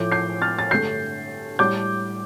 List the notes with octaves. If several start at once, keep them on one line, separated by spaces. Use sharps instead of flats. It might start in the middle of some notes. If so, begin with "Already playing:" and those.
Already playing: A2 F3 A3 D6 G6
G6 C7
F6 A6
A6
G2 D3 A3 G6 C7
A2 G3 D6 G6